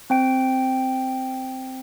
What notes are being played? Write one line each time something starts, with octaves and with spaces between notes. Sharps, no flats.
C4 G5 D7